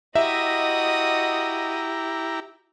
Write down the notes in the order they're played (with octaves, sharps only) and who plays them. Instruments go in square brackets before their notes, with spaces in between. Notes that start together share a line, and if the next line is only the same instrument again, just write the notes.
[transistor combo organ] E4 G4 A#5 [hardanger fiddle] F#4 D#6 [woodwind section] D#5 [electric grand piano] E5